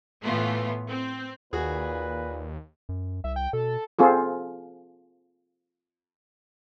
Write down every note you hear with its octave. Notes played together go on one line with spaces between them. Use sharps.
A2 E3 A3 B3 F4
C4
D#2 A#2 F#4 G#4 B4
F#2
C2 E5
G5
B2 A4
C4 F4 G#4 A4